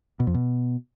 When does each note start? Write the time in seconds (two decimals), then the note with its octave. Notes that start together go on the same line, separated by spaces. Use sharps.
0.20 B2
0.27 F2
0.34 B2